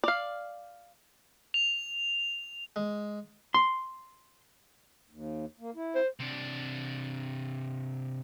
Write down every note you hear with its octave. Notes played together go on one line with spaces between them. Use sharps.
D5 F5
F7
G#3
C6
D#2
A#3
E4
C5
C3 D4